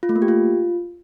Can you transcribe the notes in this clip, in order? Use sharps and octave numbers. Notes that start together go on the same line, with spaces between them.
F4
A3
A#3
G4
F4